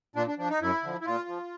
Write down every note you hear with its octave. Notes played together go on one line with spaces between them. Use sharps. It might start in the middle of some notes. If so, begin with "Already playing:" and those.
A#2 D4
D4
F3 D4
D#4
F#2 E4
D3 F3
E4
A#2 F4
F3